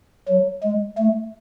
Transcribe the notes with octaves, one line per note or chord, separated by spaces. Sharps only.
F#3
G#3
A3